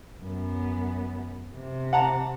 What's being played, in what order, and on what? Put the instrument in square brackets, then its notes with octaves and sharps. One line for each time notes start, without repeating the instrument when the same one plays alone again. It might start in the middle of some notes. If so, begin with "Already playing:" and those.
[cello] F#2 B3
C3
[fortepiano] F#5 A5 A#5